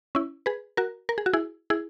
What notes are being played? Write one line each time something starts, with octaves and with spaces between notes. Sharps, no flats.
C#4 E4
G#4 B4
F#4 A#4
A#4
G#4
F#4
E4 G#4
E4 G#4